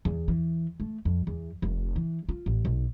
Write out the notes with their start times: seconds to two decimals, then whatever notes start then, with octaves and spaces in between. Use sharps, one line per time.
0.05 E2
0.28 E3
0.80 A3
1.05 F2
1.27 E2
1.62 F1
1.96 E3
2.29 F4
2.46 A1
2.65 B1